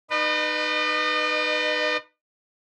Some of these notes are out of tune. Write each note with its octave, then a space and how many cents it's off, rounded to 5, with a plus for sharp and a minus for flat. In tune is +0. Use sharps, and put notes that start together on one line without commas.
D#4 -25 B4 +0 D#5 -40